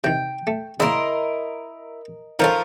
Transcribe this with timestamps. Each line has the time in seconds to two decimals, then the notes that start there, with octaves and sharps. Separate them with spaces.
0.04 C3 D#3 G5
0.47 A3
0.80 C#3 A#3 E4 A#4 D#5 C6
2.39 D#3 F3 A3 C#4 F4 A4 A#4